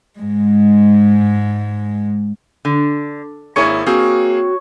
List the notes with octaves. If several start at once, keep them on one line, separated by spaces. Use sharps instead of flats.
G#2 G#3
D3
G#1 A#3 E4 G#4 A#4 C#5 C#7
A#3 C4 F#4 G#4 F5